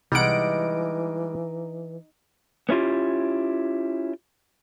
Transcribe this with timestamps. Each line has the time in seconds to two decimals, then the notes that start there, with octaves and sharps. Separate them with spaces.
0.12 C2 E3 G3 G#3 D#4 F#5 D7
2.69 B3 C#4 E4 F4 G4